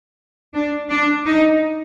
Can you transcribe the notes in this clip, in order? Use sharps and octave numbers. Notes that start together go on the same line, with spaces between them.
D4
D4
D#4